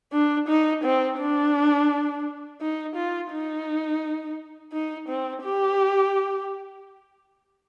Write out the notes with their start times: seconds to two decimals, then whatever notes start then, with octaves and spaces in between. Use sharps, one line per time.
0.13 D4
0.48 D#4
0.84 C4
1.19 D4
2.61 D#4
2.96 F4
3.32 D#4
4.73 D#4
5.09 C4
5.43 G4